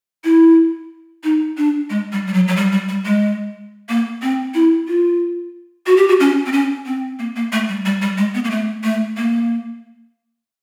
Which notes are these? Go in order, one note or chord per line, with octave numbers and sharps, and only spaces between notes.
E4
D#4
D4
G#3
G3
G3
F#3
F#3
G3
G3
G3
G#3
A#3
C4
E4
F4
F#4
G4
F#4
C#4
C4
C#4
C4
A#3
A#3
A3
G3
G3
G3
G#3
B3
A#3
A3
A3
A#3